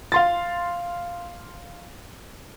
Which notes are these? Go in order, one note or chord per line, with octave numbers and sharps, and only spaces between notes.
F5 C6 A6